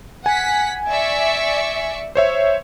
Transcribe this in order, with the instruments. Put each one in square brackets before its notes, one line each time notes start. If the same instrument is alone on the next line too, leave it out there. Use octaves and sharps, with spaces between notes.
[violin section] F#5 B6 [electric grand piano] G#5
[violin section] D5 E5 C#6
[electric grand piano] C5 C#5 E5